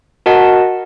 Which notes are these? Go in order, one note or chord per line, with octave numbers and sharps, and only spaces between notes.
F#4 A#4 D#5 F#5 A5